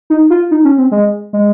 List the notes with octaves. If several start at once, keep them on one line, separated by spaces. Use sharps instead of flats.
D#4
F4
D#4
C#4
C4
G#3
G#3